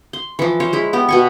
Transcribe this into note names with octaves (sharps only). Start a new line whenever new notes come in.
C6
E3 F3
C5 C#5 F5
G#3 E4
B3 G4
B2 G#5 C#6